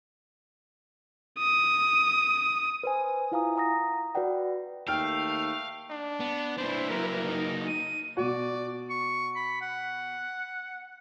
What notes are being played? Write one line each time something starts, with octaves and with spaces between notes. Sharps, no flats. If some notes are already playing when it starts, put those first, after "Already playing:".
D#6
B4 C5 G#5
E4 F4 F5 G#5 A#5 D#6
F5 F#5 A#5 D#6 A#6
F#4 B4 D5 F#5 G5
D#2 A3 F5 G5 F6
D4
B3
C4 D4 E4 B4 C5
F#3 A#3 A#4
D#4
D#7
B2 F#4 D5
C#6
B5
F#5